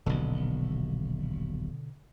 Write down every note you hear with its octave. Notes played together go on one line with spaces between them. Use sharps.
D#1 B1 B2 D3